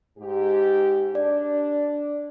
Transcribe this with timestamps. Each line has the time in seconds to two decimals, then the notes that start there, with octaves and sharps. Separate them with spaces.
0.19 G#2 G4
1.15 D4 D5